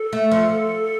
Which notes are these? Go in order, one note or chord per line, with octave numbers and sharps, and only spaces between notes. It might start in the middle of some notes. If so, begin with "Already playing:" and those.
Already playing: A4
A3
F3